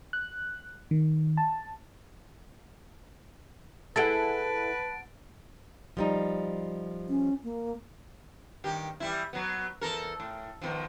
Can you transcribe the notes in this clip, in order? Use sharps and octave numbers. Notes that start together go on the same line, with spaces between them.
F#6
D#3
A5
E4 G#4 A4 B4 F#5 A5 A6 D7
F3 G3 D#4
C#4
A#3
G2 D#3 G4
E3 G3 E4
F#3 B3
E2 A4 A#4
A2
B2 D#3 F3